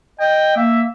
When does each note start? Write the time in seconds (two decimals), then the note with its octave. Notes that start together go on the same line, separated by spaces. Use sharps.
0.20 D#5 G5
0.56 A#3 E5